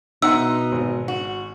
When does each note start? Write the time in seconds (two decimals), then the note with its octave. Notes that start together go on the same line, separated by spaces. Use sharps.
0.22 B2 D#4 E5 F#5 C6 E6
0.72 G#1
1.08 F#4